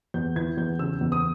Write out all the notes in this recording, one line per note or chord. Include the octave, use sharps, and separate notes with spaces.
E2 G6
E3 G#6
E2 G6
C#3 E6
E2
D#6